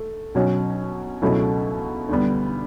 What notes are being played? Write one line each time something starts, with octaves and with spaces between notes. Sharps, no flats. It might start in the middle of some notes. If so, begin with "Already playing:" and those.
Already playing: A3
B2 F#3 C#4
C#2 B2 F#3 A3 E4
D2 D3 G3 B3